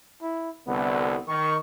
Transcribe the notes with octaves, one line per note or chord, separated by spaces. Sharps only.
E4
C2 D3 B3
D#3 C#6